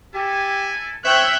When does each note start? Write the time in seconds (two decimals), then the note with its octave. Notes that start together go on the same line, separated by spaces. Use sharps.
0.15 E4 G4 A4 G#5
1.05 C5 C#5 E5 G5 F#6 G6